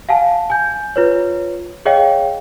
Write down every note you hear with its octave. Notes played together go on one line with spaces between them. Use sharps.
F5 F#5 G#5 A5
G#5 G6
F4 B4 C#5
G#4 C#5 D#5 F5 G5